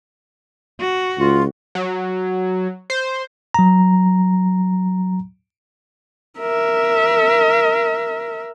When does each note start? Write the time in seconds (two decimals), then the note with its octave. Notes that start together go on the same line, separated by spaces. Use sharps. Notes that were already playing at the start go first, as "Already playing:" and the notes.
0.80 F#4
1.19 C#2 F4
1.75 F#3
2.90 C5
3.54 F#3 A#5
6.40 A#4 E5